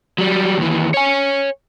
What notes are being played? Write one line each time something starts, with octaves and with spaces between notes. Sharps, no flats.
F#3 G3
D#2 E3
C#5 G#5